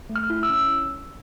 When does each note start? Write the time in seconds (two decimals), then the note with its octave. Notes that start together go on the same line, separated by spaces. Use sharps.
0.09 A3
0.16 F6
0.30 E4
0.43 E6
0.49 C#4